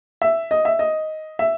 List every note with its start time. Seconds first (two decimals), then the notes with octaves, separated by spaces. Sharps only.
0.22 E5
0.51 D#5
0.65 E5
0.79 D#5
1.39 E5